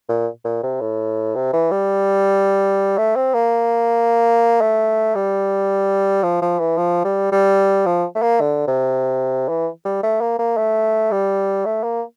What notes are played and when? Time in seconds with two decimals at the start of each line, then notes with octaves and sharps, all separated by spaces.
0.09 A#2
0.45 A#2
0.63 C3
0.81 A2
1.35 C3
1.53 E3
1.71 G3
2.98 A3
3.16 C4
3.34 A#3
4.61 A3
5.15 G3
6.23 F3
6.42 F3
6.59 E3
6.78 F3
7.04 G3
7.32 G3
7.86 F3
8.15 A3
8.22 A#3
8.40 D3
8.67 C3
9.49 E3
9.85 G3
10.03 A3
10.21 A#3
10.39 A#3
10.57 A3
11.11 G3
11.65 A3
11.83 A#3